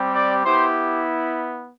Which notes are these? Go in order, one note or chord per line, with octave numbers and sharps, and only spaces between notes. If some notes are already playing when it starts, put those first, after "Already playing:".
Already playing: G3 C4 G4
D5
B3 E4 G4 C5